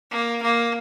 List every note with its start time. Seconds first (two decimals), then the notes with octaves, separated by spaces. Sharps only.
0.11 A#3
0.42 A#3